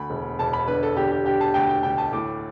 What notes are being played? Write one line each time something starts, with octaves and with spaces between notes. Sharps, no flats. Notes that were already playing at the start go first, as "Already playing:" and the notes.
Already playing: D2 B5
E1
E1 A5
B5
D3 B4
A4
D3 G4
G4
D3 G4
A5
D2 G5
G5
D2 G5
A5
A2 D6